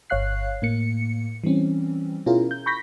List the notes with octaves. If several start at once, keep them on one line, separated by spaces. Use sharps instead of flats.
G1 C#5 F5 F#6 C7
A2 A#3 C#7
E3 G3 C4 C#4
B2 C#4 E4 F4 G#4 A#4
G6
B5 C#6 G6 A#6 B6